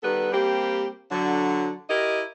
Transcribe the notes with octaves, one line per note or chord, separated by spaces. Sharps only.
D#3 G3 B3 A4 B4
G3 A#3 C4 G4
D3 F#3
E4 G4 A#4 D#5